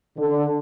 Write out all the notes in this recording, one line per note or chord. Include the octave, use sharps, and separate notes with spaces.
D3